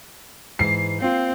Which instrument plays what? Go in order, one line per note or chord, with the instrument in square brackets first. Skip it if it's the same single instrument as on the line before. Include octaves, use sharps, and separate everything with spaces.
[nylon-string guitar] G#2 E3 [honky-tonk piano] C7
[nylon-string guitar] A#3 F4 [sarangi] C4